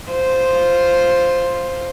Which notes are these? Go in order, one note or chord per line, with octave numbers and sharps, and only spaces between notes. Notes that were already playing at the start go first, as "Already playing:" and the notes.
F4 C5